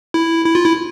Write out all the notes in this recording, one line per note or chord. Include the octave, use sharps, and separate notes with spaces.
E4
E4
F4
E4